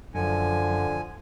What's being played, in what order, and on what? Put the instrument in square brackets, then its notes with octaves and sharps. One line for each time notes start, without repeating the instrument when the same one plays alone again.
[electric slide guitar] F#2 [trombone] D3 [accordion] F3 G#5